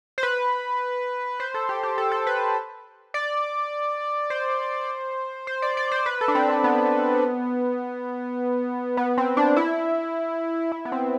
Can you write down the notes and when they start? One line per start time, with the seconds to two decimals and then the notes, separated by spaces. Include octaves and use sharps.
0.18 C5
0.23 B4
1.40 C5
1.54 A4
1.69 G4
1.83 G4
1.98 A4
2.12 A4
2.27 B4
3.14 D5
4.30 C5
5.47 C5
5.62 D5
5.77 D5
5.91 C5
6.06 B4
6.21 A4
6.28 D4
6.35 C4
6.50 C4
6.64 B3
8.97 B3
9.18 C4
9.37 D4
9.56 E4
10.72 E4
10.85 B3
10.92 C4